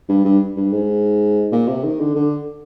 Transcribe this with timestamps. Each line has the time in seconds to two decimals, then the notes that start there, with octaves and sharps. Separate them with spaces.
0.09 G2
0.25 G2
0.56 G2
0.73 G#2
1.52 A#2
1.68 C3
1.84 D#3
2.00 D3
2.15 D3